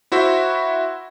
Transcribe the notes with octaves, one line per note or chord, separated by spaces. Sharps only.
E4 F#4 C5 E5